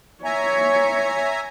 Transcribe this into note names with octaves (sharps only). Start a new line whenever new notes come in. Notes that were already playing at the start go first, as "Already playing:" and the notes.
C#5 E5 G#5 A#5